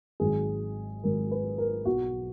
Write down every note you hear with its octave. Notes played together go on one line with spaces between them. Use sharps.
G#1 G#2 F#3 G#4
G#1 G#2 F#3 A#4
B4
A#4
B1 B2 F#3 F#4